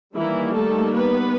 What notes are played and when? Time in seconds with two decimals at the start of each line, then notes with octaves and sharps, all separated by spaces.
0.16 D#3 E3 G3 A#3 E4
0.55 A3 A4
0.94 B3 B4